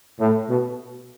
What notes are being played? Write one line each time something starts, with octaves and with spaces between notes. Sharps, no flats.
A2
B2